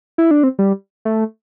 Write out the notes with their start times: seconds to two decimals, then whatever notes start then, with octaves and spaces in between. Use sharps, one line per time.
0.18 E4
0.31 D4
0.43 C4
0.59 G3
1.05 A3